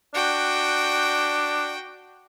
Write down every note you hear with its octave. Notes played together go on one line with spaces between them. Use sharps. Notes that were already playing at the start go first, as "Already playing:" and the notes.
D4 F#4 G5